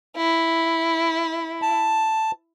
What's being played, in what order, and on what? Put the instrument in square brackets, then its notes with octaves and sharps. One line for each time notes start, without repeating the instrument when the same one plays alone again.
[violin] E4
[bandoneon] A5